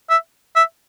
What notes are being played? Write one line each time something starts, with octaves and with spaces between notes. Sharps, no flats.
E5
E5